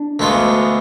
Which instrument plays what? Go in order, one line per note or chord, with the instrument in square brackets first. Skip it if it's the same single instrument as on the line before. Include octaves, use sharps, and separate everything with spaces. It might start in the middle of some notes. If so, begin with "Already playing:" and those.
Already playing: [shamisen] D4
[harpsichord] D2 D3 G#3 B3 F4